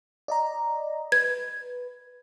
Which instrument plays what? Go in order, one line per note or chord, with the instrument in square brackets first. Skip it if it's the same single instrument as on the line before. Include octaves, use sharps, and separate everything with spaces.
[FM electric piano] D5 D#5 A#5
[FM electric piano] B4 [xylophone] G#6